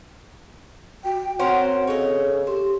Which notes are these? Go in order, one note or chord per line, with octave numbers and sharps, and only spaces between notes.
F#4 G5
C4 C#4 F#4 A#4 C5 F#5
C#3 A4 C#5 D#5
G4 C5